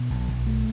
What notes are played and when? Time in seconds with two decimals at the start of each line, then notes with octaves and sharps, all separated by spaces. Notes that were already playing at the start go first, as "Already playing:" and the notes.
Already playing: B2
0.10 B1
0.29 B1
0.47 A3